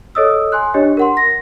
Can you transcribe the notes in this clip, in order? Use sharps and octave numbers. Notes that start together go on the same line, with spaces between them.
A4 C#5 D#5 D#6 E6
G#5 C6 F#6
D4 G4 C#5 D#5
A#4 F#5 C6
A#6